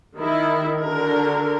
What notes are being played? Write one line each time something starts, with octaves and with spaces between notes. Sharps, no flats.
D#3 E4
D3 F#4 A#4